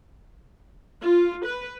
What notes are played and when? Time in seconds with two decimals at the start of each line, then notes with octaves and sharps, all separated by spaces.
1.01 F4
1.45 B4